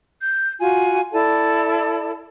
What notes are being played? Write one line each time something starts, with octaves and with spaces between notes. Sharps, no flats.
G6
F4 F#4 G#5
E4 A4 D5 A5